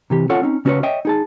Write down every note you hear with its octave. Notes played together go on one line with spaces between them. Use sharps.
C3 E3 G4
C#4 F4 A4 C#5 F#5
C4 C#4 D#4
C#3 C#4 F#4 A4 B4 C#5
C#5 D#5 E5 G5
D#4 G#4 A5